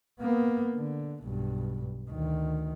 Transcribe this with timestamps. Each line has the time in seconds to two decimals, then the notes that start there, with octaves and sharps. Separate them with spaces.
0.20 A#3 B3
0.75 D3
1.24 B1 G2
2.10 D2 D#3